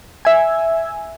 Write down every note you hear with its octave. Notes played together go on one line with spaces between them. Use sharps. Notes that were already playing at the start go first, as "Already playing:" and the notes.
E5 G#5